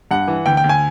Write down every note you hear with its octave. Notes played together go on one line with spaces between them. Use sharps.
G2 F#5
E3
D2 G5
G5
D2
G#5